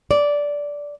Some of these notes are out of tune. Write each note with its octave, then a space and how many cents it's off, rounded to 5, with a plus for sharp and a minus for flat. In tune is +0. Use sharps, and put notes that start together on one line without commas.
D5 -10